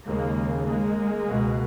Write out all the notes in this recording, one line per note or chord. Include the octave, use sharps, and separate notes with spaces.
D#2 C#3 G#3 A#3
G#3 A#3
C#2 B2